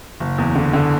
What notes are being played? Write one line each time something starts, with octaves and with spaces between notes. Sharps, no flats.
F#1
E2
D3
D3